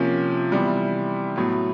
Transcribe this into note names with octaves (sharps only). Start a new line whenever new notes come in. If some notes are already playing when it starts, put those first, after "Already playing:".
Already playing: C3 F3 A#3 C#4
C3 E3 G3 B3
A2 F#3 B3